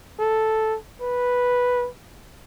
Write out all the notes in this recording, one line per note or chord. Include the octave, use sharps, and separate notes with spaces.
A4
B4